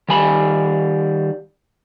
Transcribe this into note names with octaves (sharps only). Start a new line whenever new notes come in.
D#3 G3 G#5 B5